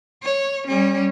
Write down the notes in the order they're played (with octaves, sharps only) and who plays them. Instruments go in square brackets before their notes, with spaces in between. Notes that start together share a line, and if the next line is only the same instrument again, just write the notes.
[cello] C#5
G3 C#4